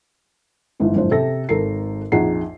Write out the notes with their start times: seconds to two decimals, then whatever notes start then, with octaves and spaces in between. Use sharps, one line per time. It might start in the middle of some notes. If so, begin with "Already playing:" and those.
0.80 G1 G#2 E3
0.96 F#1 G#2 F3 C5
1.11 C3 A4 A#6
1.49 G#1 A4 A#4 C7
2.12 A#1 F2 D#4 G#4 F#5 C7